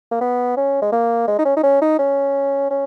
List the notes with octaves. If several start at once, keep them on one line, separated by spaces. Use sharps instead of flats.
A#3
B3
C#4
G#3
A#3
G#3
D#4
C#4
D#4
C#4
D#4
C#4
C#4